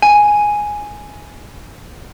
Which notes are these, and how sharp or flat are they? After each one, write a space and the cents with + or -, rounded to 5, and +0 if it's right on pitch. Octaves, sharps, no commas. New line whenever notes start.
G#5 +0